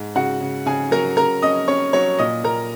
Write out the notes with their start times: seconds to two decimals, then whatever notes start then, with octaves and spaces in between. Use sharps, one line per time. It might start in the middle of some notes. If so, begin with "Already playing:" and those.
Already playing: G#2
0.15 C#3 F#4 F#5
0.41 C#3
0.66 C#3 G#4 G#5
0.91 F#3 A#4 A#5
1.17 C#3 A#4 A#5
1.42 C#4 D#5 D#6
1.68 C#4 C#5 C#6
1.93 F#3 C#5 C#6
2.19 A#2 D#5 D#6
2.44 A#2 A#4 A#5